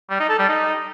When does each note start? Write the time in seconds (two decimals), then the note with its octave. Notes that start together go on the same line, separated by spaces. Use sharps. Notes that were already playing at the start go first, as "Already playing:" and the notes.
0.10 G3
0.20 D#4
0.29 A4
0.39 G3
0.49 D#4